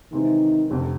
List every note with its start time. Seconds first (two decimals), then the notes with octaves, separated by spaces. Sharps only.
0.12 C3 D#3 E3 G#3 C4
0.70 F1 F2 D3 G3